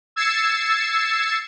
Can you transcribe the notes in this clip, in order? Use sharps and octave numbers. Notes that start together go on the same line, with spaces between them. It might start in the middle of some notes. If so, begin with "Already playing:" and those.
E6 G#6 A6 C7 C#7 E7